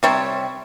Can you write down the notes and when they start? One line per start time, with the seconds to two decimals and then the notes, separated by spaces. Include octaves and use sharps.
0.03 C3 G3 C4 C#5